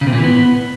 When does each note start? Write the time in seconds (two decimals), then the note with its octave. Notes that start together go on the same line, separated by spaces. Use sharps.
0.01 C#3
0.07 C3
0.13 A#2
0.18 E3
0.24 B3